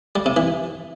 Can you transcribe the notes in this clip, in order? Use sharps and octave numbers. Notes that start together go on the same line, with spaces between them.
G3
C3
E3